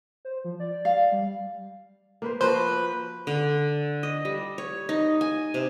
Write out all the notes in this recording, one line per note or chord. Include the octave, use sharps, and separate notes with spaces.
C5
F3
D5
F5
G3
A#3 B4 C5
F3 A#3 F#4 B4 C5
D3
D#5
G3
C#5
D#4
G#5
C3